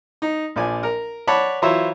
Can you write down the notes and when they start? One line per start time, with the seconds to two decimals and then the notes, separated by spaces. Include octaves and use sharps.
0.22 D#4
0.56 A#1 F3 D5 G#5
0.83 A#4
1.28 C#5 D5 F#5 A5 B5 D6
1.62 E3 F#3 F4 C5 C#5 E5